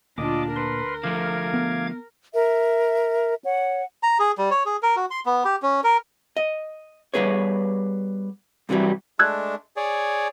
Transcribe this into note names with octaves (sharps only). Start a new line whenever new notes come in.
D2 A#2 D4 F4 D#5 D6
A#4 B4 C6
D3 F3 A3 F5 D6 G#6
B3
A#4 E5
C#5 F#5
A#5
G#4
G3
C#5
G#4
A#4
F#4
C6
B3
G4
C#4
A#4
D#5
G3 B3 G#4 B4 C#5
G2 C3 E3 F#3 G3
G#3 A3 D4 E6 F#6 G#6
G#4 C#5 D5